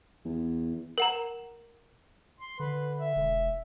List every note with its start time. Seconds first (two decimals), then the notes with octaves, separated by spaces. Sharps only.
0.25 E2
0.98 A#4 F#5 A#5
2.40 C6
2.60 D3 B4
2.98 E5
3.16 E1